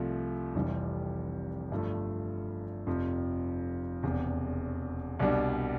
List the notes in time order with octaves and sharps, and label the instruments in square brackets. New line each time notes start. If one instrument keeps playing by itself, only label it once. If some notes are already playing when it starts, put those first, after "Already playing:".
Already playing: [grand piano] C2 C3 F3 A3
F1 F2 C3 E3 G3
G1 G2 F3 A3
F1 F2 C3 F3
E1 E2 C3
C2 B2 G3 D4